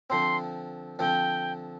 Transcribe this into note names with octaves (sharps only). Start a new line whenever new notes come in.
D3 F3 C4 C6
D3 F3 C4 G5